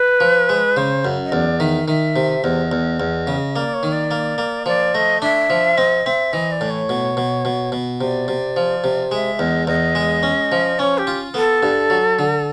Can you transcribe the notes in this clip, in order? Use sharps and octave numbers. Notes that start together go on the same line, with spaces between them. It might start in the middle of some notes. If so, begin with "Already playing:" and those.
Already playing: B4
F3
G#3
C#3 C5
F#2
D#5
E2 D5
D#3 E5
D#3 E5
C3
E2 D#5
E2
E2
C#3
A#3 D5
C#5
D#3
D5
A#3
A#3
F3 D5
A3 D#5
D4 E5
F3
C4 D#5
C4 E5
E3 D#5
D5
A2
C#5
B2
B2
B2
B2
C3 D5
C3
F3
C3
G#3 E5
E2 D#5
E2 D#5
G#3
C#4
F3
C#4 C#5
G4
F4
B3 A4
G2
F#3
D3